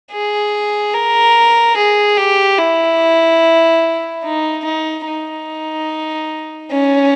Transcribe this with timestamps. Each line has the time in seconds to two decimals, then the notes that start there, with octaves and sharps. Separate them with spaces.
0.12 G#4
0.94 A#4
1.77 G#4
2.17 G4
2.59 E4
4.25 D#4
4.65 D#4
5.07 D#4
6.72 C#4